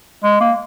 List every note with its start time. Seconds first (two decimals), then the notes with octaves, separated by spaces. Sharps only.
0.24 G#3
0.41 A#3